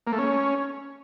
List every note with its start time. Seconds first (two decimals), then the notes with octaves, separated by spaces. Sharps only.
0.07 A#3
0.13 A3
0.19 C#4